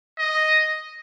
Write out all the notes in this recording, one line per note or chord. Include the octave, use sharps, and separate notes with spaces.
D#5